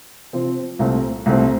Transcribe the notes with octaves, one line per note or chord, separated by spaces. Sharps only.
C3 F3 C4 F4
C2 A#2 A3 C4
C2 A#2 A3 C4